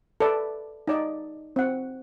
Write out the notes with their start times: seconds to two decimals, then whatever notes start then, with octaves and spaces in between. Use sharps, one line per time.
0.20 A4 B4 D5
0.87 D#4 D5 D#5
1.56 C4 F#5